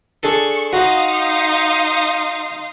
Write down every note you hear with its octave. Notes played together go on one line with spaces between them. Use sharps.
D4 G#4 A4 C#6
D#4 F#4 F5 C6 D#6